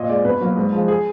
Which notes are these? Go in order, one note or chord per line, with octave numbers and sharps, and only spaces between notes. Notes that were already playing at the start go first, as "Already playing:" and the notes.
Already playing: A#2 D#5
G#3 D5
B2 B4
F#3 A#3
G#2
F3 G#3
G#4